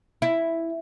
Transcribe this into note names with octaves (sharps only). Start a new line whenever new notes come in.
E4